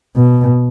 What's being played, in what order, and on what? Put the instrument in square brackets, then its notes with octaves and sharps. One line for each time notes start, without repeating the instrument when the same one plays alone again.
[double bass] B2